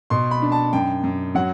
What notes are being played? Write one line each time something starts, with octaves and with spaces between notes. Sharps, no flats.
B2 C6
B5
D4
A5
F#2 G5
F#2
F#3 F#5